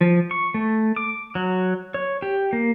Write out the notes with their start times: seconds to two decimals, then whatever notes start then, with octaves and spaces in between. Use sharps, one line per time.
0.01 F3
0.31 C#6
0.54 A3
0.96 D6
1.35 F#3
1.94 C#5
2.22 G4
2.53 A#3